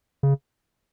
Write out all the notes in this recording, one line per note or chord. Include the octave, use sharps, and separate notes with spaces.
C#3